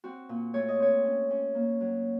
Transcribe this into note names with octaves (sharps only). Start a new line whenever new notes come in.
C4 F#4
A#2
A3 C#5
D#5
C4 C#5
C#4
C#4
A#3
F#3